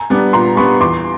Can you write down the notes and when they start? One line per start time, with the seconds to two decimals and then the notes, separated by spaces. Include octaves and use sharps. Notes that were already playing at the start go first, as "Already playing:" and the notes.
Already playing: G#5 A#5
0.10 G3 B3 D4
0.33 A#2 A#5 C6
0.57 G3 B3 D4 B5 C#6
0.80 E2 C6 D6